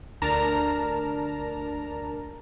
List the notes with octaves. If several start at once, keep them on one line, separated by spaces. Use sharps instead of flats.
D2 D4 A#4 A5 A#5